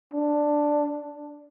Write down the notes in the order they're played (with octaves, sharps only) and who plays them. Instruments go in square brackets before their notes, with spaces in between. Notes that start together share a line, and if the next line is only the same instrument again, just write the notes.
[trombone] D4